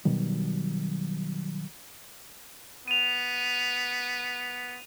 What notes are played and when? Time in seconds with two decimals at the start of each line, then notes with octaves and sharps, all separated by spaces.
0.05 B2 D#3 F#3 G3
2.88 B3 D#7 F7